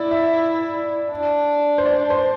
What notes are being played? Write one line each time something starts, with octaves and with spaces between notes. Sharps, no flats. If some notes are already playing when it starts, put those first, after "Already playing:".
Already playing: E4 D5
E5
D4
C5
D5
C5